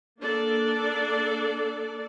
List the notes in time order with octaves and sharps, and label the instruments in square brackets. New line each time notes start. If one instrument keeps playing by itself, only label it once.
[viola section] A#3 D4 A4 D5